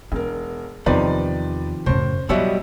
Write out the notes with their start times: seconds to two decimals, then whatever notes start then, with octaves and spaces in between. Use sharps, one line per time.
0.12 E1 D4 A#4
0.86 E2 C3 D#3 F3 B3 B4 D5 D#5
1.86 F#2 A2 C#3 C5
2.29 B2 F#3 G3 E4 D#5 E5 E6